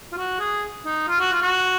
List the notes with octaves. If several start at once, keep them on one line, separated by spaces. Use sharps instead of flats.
F4
F#4
G#4
D#4
F4
F#4
F4
F#4